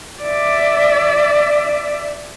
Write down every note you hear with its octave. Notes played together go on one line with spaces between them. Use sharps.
D5 E5